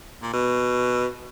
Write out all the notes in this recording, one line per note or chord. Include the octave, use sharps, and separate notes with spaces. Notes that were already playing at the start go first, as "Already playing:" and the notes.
A#2
B2